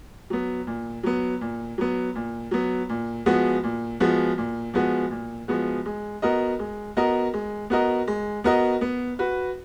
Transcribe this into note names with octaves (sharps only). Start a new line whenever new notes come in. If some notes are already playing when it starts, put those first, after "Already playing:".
F#3 B3
A#2
F#3 B3
A#2
F#3 B3
A#2
F#3 B3
A#2
F3 G#3 B3 F#4
A#2
F3 G#3 B3 F#4
A#2
F3 G#3 B3 F#4
A#2
F3 G#3 B3 F#4
G#3
B3 F#4 A#4 D#5
G#3
B3 F#4 A#4 D#5
G#3
B3 F#4 A#4 D#5
G#3
B3 F#4 A#4 D#5
B3
F#4 B4